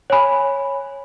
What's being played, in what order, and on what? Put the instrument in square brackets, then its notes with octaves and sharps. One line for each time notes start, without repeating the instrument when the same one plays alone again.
[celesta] C#5 G#5 B5